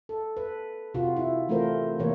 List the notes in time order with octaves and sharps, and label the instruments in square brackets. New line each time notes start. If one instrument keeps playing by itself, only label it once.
[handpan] A4
B4
C3 F4 F#4
E4
E3 A3 C4 F4 A#4 C5
C3 E3 A#3 A#4 C#5